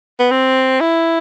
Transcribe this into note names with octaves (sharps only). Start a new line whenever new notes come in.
B3
C4
E4